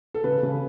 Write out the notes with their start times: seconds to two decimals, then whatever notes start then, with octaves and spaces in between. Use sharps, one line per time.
0.14 A4
0.24 C#3 B4
0.43 C#3